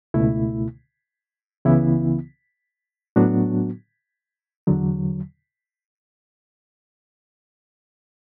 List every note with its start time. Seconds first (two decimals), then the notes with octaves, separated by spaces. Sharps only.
0.14 C#2 B2 A3 E4
1.65 C#2 C#3 E3 B3 E4
3.16 A2 F#3 B3 D4 F#4
4.67 E2 D3 F#3